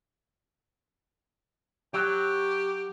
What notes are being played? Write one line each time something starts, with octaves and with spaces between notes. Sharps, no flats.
F#3 G4